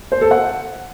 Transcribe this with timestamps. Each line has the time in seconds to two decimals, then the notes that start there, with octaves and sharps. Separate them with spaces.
0.12 C5
0.21 A4
0.31 F#5